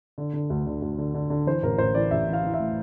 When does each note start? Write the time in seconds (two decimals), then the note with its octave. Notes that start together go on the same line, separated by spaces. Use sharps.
0.18 D3
0.33 D3
0.50 D2
0.66 D3
0.82 D2
0.98 D3
1.14 D3
1.30 D3
1.47 E3 C5
1.62 A1 A#4
1.78 A1 C5
1.95 E3 D5
2.11 A1 E5
2.28 E3
2.33 F5
2.44 E3
2.54 E5
2.60 A2